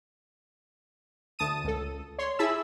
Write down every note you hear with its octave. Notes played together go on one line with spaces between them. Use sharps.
D2 A5 D#6 D#7
C#2 A4
C#5 C6
E4 G#4 E5 A5 B5 E6